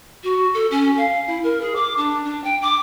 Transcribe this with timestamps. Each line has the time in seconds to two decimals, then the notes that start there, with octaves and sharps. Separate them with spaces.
0.23 F#4
0.54 A4
0.71 C#4
0.97 F5
1.27 E4
1.43 A#4
1.61 G#4
1.76 D6
1.97 D4
2.24 D4
2.44 G5
2.62 D6